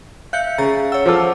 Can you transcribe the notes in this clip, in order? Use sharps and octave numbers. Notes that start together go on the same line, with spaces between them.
E5 F5 F#6 G6 C#7
C#3 A#5 A6
C#5 F#5 E6
F3 A4 A5 D6 F6